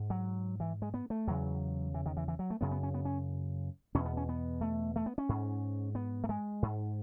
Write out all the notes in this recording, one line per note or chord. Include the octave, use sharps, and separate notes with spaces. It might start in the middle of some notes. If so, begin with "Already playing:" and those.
Already playing: G#2
F#3
E3
G#3
B3
A3
E2 C#3 F#3
E3
D#3
E3
E3
F#3
A3
F#2 C#3 B3
B3
C#4
B3
C#4
E2 B2 C#4
B3
C#4
B3
A3
A3
B3
C#4
G#2
B3
A3
G#3
G#2